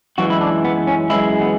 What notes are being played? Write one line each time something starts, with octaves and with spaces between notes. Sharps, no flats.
F#2 E3 G#3 F#4
E4
D4
B3
C#4
F#2 E3 G#3 E4
B3